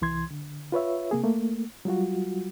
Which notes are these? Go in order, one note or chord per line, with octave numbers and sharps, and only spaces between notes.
C2 E3 C6 G#6
D3
F4 B4 C#5 E5
C3 A#3 G#4
A3 A#3
F#3 G3 F4 F#4